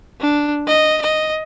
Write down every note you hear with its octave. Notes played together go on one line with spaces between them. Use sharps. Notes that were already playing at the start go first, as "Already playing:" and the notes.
D4
D#5
D#5